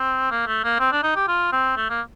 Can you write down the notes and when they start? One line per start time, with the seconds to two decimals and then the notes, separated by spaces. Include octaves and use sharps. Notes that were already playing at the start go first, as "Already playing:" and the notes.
Already playing: C4
0.31 A#3
0.47 A3
0.64 A#3
0.79 C4
0.92 D4
1.03 D#4
1.16 G4
1.28 F4
1.52 C4
1.77 A3
1.90 A#3